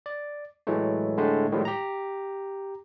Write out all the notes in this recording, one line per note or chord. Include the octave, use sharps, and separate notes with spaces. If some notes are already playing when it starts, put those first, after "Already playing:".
D5
A2 E3 F#3 G#3 A3
A2 D3 G#3 A3
A2 D#3 F3 G3 G#3
G4 A#5